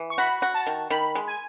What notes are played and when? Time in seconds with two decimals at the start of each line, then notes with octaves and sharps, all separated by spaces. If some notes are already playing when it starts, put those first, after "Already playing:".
Already playing: E3
0.10 C#6
0.18 F#4 B5
0.42 F#4
0.54 A5
0.66 D#3
0.90 D#3 B5
1.15 G#3
1.28 G#5